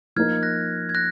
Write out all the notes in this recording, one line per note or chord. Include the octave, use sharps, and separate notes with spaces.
F3 A#3 D#4 A#4 F6 G#6
F#6 A#6
G#6
F#6 A#6